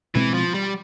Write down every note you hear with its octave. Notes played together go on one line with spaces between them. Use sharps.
B2 E3 G#3 C4
F3
G3